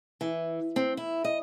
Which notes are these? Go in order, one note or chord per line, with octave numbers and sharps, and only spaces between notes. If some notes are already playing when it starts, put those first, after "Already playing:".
E3
C4
E4
D#5